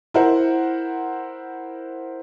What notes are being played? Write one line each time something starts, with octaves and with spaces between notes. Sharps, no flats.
E4 A#4 C5 F#5